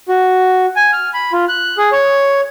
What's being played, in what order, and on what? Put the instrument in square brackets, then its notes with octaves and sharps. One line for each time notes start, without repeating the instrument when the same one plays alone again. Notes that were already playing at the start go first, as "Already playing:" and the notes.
[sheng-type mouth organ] F#4
G#5
F6
B5
F4
F#6
G#4
C#5